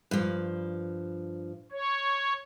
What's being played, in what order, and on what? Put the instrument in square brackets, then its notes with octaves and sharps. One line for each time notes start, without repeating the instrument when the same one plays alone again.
[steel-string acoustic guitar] G2 F3
[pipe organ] C#5